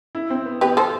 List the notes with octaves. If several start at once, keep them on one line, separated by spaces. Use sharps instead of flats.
E4
C4
B3
B3 G4 B4
A4 C5